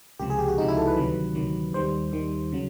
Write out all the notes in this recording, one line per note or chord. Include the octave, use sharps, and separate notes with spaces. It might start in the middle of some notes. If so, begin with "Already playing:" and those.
C#2 C3 F3 G4
G#4
G4
F#4
C#2 C3 F3 D#4
E4
A4
B4
D2 C3 D#3 F#3
D2 C3 D#3 F#3
D#2 D#3 G3 C5
D#2 D#3 G3
C#3 F#3